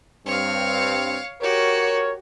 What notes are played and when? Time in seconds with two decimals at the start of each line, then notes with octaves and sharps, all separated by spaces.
0.27 G2 C4 C#5 F5
1.41 F#4 G4 A#4 C#5